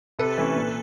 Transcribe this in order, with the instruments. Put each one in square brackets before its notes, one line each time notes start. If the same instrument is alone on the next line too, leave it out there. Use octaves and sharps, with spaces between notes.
[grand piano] C3 [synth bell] A4 B4
[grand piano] E3 A3 C#4
A#2